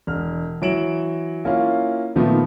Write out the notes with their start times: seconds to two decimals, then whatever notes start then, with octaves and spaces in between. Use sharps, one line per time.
0.07 E1 F6
0.62 E3 F#3 D7 E7 F#7
1.45 A#3 C#4 E4 F4 F5
2.16 A#2 D#3 F3 A3 B3